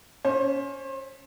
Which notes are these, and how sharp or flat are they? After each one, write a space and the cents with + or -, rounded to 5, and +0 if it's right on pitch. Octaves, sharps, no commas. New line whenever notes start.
C#4 +15 C5 +35